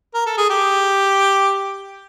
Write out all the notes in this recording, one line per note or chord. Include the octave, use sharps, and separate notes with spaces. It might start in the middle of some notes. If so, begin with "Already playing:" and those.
A#4
A4
G#4
G4